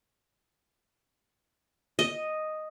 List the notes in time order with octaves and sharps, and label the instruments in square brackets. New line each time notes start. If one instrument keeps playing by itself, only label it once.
[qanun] D#5